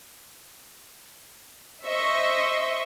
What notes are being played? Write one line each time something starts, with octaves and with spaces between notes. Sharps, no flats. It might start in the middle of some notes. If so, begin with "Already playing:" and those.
C5 D#5 E5 C#6